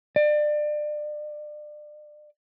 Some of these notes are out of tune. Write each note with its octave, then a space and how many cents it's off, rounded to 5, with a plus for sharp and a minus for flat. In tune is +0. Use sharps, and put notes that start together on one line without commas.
D5 +30